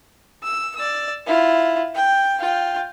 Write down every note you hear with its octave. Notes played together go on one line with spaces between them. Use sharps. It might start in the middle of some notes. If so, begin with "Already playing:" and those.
E6
D5 E6
E4 F4
G5
F4 G5